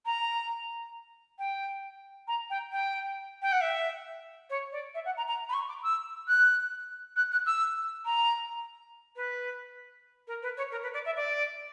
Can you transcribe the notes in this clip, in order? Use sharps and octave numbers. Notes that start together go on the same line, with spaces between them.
A#5
G5
A#5
G5
G5
G5
F#5
E5
C#5
D5
E5
F#5
A#5
A#5
B5
C#6
D6
E6
F#6
F#6
F#6
E6
A#5
B4
A#4
B4
C#5
A#4
B4
D5
E5
D5